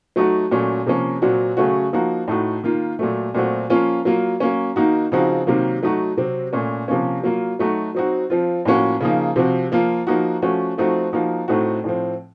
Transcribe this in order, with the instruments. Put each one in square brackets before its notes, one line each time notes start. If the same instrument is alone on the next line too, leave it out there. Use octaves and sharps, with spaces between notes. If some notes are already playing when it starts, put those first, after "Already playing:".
[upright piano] F#3 A3 D#4 F#4
A#2 F#3 A3 C#4
C3 F3 A#3 C#4
A#2 F#3 C4 F#4
C#3 F#3 A3 C#4 F#4
F3 A#3 D#4 F#4
A2 A3 D#4 F#4
D#3 A#3 F4
A#2 F#3 A3
A#2 F#3 A3 C4 F#4
F3 A#3 C#4 F4
F#3 A#3 F4
F#3 A#3 C#4
D#3 A#3 D#4 F#4
C#3 F3 C4 D#4 F#4
C3 D#3 F#3 A#3
F#3 A3 D#4 F#4
C3 F#3 C4
A#2 A3 C#4
C3 F3 A#3 C#4
F#3 A#3 F4
F#3 A3 D#4 F#4
F#3 C4 D#4 F#4
F3 C4 F4
A2 F3 A#3 C#4 F#4
C#3 F3 A#3 D#4
C3 F3 C4 F#4
F3 A#3 F4
F3 A#3 D#4 F#4
F3 A3 C#4 F#4
F3 A3 C4 D#4 F#4
F3 A#3 D#4 F#4
A2 A3 C4 D#4 F#4
A2 F3 C4